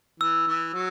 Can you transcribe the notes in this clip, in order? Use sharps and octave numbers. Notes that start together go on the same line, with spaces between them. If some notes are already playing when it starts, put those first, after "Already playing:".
E3 E6
E3
F#3